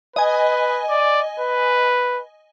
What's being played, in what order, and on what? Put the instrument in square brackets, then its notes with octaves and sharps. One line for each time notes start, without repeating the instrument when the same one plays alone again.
[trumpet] B4 [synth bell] D#5 G#5
[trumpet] D5
B4